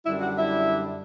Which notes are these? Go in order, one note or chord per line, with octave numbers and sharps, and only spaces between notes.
F#2 D3 G3 D4 E4 E5
F#4 F#5
E4 E5